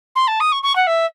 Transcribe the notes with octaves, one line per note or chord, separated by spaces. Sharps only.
C6
A5
D#6
C#6
C#6
F#5
E5